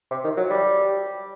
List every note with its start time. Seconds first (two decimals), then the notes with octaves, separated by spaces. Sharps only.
0.11 C3
0.24 D#3
0.37 F#3
0.50 G3